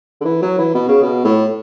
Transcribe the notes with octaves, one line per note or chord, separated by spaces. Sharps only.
D3
E3
F#3
E3
B2
C#3
B2
A2